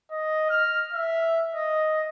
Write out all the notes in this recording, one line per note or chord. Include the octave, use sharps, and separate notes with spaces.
D#5
F6
E5
D#5